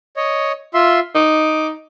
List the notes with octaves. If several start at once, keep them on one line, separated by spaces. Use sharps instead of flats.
C#5 D#5
F4 E5 C6
D#4 D6